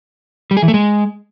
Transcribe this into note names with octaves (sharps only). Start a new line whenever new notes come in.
G3
G#4
E3
A3
G#3